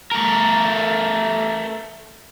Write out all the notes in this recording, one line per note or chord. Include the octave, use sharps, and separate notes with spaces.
A3 A#4